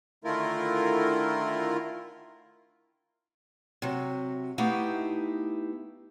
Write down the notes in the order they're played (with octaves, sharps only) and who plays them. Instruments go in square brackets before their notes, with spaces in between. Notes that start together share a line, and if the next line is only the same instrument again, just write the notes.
[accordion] D3 D#3 A3 E4 F4 A#4
[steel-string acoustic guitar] C3 F#3
A3 B3 D#4 E4 G4 F5